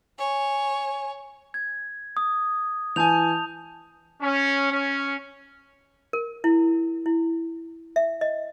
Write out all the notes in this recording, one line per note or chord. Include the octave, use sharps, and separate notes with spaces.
C#5 G#5
G#6
D#6
E3 G#5 A5 G6 F7
C#4
C#4
A#4
E4
E4
E5
D#5